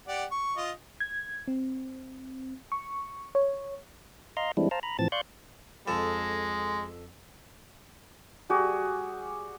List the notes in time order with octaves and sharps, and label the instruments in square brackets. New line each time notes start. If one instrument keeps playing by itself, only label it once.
[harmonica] G4 D5 F#5
C#6
F4 D#5
[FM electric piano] G#6
C4
C#6
C#5
[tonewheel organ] D#5 F5 A#5 C6
E3 G3 G#3 C4 D4 E4
C5 F5 A5 A#5
A#5 B5
A2 E3 F3 C4 A5 A6
D5 F5 C6 C#6 F#6 G6
[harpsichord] F2 A4 [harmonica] G#3
[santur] G3 F#4 G#4 D5